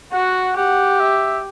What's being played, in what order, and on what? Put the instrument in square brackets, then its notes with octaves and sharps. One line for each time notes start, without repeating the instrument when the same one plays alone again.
[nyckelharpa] F#4 [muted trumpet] F#5
[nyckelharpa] G4 [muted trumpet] F#5
[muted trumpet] E5